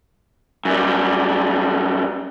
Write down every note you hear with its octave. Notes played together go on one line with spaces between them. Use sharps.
F#2 G3